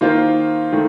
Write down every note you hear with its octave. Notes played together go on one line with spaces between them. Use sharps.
D#3 A#3 F4 C5
D#3 A3